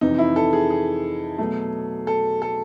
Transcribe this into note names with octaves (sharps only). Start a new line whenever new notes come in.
F2 C3 E3 D#4
E4
A4
G#4
G#4
B2 F#3 A3
A4
A4